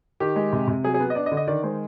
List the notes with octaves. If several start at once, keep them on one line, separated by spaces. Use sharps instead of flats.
D#3 G4
G#3
C3
C3
F#3 G#4
G#4
B3
D#5
D4 D5
D#5
D3
D#5
D#3 D5
G#3 C5